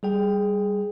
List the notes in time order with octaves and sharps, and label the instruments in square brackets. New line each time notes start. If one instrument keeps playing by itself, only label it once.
[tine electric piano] G3 G#4 G5